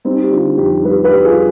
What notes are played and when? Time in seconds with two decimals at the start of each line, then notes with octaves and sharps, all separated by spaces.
0.05 G3 C4 D#4
0.23 G4
0.31 D3 D4 F4
0.57 F2 D#4 G4
0.84 G3 G4 B4
1.04 G4 B4
1.12 G3
1.25 F4 G#4